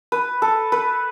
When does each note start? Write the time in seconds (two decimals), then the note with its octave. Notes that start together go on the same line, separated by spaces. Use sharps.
0.12 B4
0.42 A4
0.72 B4